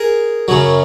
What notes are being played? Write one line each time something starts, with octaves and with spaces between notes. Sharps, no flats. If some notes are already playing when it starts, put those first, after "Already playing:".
Already playing: G#4 A#4
F#2 C#3 F#3